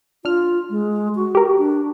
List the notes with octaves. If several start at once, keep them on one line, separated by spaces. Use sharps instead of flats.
D4 F4 F6
G#3
F#4
G4 A#4
D4